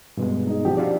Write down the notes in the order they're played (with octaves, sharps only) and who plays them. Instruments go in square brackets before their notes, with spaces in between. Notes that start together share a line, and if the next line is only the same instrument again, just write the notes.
[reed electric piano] G2 B2 G#3
[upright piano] D#4 G#4
A#1 F3 G4
[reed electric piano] F4 F#4 D5